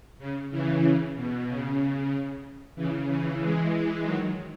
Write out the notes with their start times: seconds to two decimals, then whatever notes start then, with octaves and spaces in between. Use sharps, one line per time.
0.19 C#3
0.50 C#3 E3
0.83 C#3
1.15 B2
1.47 C#3
2.75 C#3 E3
3.07 C#3 E3
3.40 E3 G#3
4.04 D#3 F#3